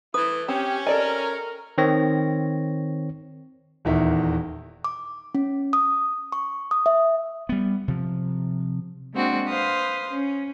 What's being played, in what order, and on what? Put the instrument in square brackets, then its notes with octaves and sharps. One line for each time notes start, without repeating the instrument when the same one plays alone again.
[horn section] E3 A3 E4 [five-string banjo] B4 [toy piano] D#6
[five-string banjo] C4 [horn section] C#4 [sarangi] G4
[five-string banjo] A4 D5 G#5 [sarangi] A#4 [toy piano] D#5
[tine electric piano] D#3 C4 C#5 A#6
[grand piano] D#1 E2 D#3 E5
[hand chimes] D6
C#4
D#6
C#6
D#6
E5
[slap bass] G3 B3
C3 F3
[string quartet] G#3 A#3 C4 D4 F#4
B4 C5 F5 D#6
C#4